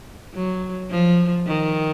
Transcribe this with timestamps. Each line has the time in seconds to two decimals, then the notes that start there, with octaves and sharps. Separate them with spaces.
0.34 F#3
0.91 F3
1.47 D#3